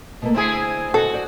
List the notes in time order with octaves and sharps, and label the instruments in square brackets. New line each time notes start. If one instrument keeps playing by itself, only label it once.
[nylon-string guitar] B2 A3 A#3
[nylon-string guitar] D2 [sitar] C4 E4 G#4
[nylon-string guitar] B2 [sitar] F#4 [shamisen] A4
[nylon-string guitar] C5 D5